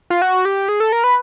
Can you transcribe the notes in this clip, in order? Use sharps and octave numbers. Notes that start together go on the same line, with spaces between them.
F4
F#4
G4
G#4
A4
A#4
B4